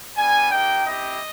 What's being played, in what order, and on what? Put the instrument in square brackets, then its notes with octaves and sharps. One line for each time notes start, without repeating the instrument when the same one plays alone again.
[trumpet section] G3 B3 D4 G#5
A#3 D#4 G4 G5
C4 E4 G4 D#5